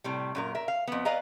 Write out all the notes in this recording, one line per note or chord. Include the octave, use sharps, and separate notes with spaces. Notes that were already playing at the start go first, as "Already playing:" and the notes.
A2 C3 G3
F#2 A#2 A#4
A#4 E5
F5
F2 B3
B4 D5 D#5 F5 G#5 A#5